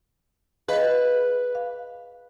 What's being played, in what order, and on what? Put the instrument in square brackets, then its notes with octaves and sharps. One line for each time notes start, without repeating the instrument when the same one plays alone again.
[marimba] G#4 D#5 F5 [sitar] B4
[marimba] F5